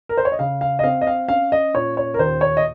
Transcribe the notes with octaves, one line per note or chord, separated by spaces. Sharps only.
A#4
C5
C#5
D#5
C#3 F5
F5
D#5
C4 F5
D#5
F5
C#4 F5
D#5
A#2 C#5
C#5
A#4
D#2 C5
C#5
D#5